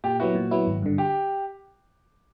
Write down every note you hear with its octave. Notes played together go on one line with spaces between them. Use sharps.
A#2 G4
F#3 B3 E4 F#4
A#2
F#3 B3 E4
G#1
G2 D3
G4